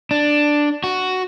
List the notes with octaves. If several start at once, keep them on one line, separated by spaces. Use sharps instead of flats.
D4
F#4